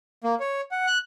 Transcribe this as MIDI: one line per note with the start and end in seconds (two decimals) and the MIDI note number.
0.24 0.35 58
0.40 0.61 73
0.71 0.86 78
0.87 0.98 90